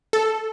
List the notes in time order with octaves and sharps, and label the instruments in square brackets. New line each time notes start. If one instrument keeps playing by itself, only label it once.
[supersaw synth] A4